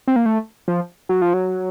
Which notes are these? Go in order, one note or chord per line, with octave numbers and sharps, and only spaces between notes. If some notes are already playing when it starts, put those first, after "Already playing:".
C4
A#3
A3
F3
F#3
F3
F#3